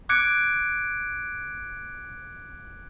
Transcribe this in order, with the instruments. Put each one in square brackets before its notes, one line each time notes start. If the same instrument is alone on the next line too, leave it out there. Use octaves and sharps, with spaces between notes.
[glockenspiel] D6 F#6 G#6 C#7 D7